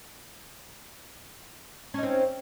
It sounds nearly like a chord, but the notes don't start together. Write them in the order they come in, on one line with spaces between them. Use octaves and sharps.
C#4 D#4 C4